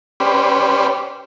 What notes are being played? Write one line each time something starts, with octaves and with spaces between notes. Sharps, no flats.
C#4 G4 B4 C5 D5